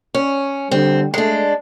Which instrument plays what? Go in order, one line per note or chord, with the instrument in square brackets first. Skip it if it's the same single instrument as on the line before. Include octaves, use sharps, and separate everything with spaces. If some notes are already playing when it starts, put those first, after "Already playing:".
[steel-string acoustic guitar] C#4
[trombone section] D3 G3 [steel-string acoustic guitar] C4
[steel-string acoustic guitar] G#3 D4 [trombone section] A3